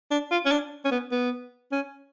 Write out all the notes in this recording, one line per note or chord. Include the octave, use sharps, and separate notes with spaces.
D4
F4
C#4
D4
C#4
B3
B3
C#4